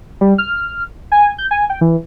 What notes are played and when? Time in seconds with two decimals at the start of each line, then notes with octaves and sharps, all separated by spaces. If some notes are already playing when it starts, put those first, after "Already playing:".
0.21 G3
0.38 F6
1.12 G#5
1.38 G6
1.51 G#5
1.70 G5
1.81 E3